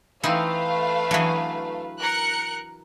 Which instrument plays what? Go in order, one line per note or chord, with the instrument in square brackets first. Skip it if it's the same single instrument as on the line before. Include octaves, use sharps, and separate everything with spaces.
[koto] E3 C4 D#4 [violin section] A3 F5 [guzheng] E4 [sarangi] B4
[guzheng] E3 F#3 [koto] D4 G#4
[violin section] A#4 F#6 C#7